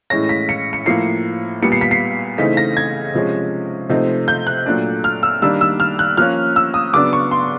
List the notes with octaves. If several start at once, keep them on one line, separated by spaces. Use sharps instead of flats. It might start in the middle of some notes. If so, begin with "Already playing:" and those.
A2 E3 G#3 C#4 A#6
B6
C#7
C#7
A2 F3 A#3 C7
A#2 G3 B3 C#7
C7
B6
C7
C#3 E3 A3 C4 D#4 B6
A#6
G#6
C3 F3 G#3 C#4
C3 F3 A3 C4 D#4
G6
F#6
A#2 F#3 A3 D4
F6
E6
D#3 G3 A#3 D4 E6
E6
F6
F#6
F3 A#3 C#4 F6
E6
D#6
C#3 F#3 B3 D4 D6
C#6
C6